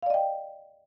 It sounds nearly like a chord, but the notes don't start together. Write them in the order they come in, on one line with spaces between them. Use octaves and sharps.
F5 D5 D#5 G5